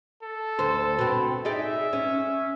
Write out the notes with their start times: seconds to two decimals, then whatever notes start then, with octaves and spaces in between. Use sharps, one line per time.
0.23 A4
0.59 D2 C5
0.99 B2 C4
1.45 D#4 G#4 D5 E5
1.93 C#4